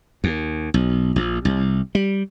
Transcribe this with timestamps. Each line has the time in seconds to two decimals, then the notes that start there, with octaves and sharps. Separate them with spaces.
0.24 D#2
0.74 B1
1.16 A#1
1.45 C2
1.95 G3